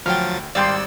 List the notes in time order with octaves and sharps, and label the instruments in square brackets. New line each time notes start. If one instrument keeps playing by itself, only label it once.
[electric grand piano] D2 [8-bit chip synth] F3 F#3 A6 [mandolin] G5 F6
[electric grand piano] G#1 G3 D5 [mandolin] F5 G5 C6 [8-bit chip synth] E6